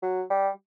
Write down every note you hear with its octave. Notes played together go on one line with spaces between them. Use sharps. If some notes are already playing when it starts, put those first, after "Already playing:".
F#3
G3